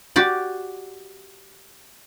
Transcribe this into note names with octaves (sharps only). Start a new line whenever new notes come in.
F#4 G4 D5